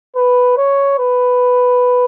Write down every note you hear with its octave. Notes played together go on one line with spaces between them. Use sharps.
B4
C#5
B4